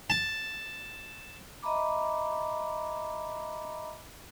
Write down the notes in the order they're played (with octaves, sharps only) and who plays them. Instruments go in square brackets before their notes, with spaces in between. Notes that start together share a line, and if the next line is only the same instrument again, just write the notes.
[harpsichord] A5
[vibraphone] D#5 E5 A#5 B5 D6